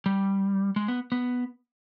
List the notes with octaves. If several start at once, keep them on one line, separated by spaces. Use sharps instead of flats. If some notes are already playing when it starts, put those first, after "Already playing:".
G3
G#3
B3
B3